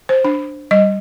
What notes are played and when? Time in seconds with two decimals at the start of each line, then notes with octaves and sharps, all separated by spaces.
0.09 C5
0.24 D4
0.71 G3 D#5